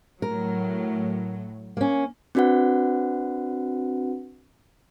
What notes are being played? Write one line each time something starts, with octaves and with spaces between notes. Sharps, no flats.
A2 F#3 A#4
A#3 C#4
C4 D4 F#4 B4 F#5